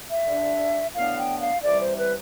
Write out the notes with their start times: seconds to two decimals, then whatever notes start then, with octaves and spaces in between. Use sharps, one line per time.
0.10 E5
0.27 D3 G3 D4
0.95 A2 E3 B3 D4 F5
1.18 G5
1.41 F5
1.64 C3 E3 G3 D5
1.81 C5
1.99 B4